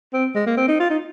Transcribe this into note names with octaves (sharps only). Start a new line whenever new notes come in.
C4
G#3
A#3
C4
D#4
F4
D#4